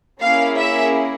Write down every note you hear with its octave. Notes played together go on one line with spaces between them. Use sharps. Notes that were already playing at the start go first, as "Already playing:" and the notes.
A#3 C#4 E4 G#4 F5
E5